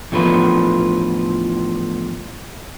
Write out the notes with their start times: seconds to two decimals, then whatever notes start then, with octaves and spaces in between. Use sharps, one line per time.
0.12 E2 A2 D3 F3 B4